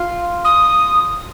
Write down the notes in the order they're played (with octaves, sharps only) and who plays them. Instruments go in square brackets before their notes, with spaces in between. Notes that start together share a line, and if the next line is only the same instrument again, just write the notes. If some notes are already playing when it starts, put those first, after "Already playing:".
Already playing: [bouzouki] F4
[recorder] D#6